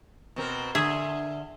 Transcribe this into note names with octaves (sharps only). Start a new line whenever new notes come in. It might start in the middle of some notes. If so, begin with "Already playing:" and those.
B2 C4 A#4
D3 G#4 E5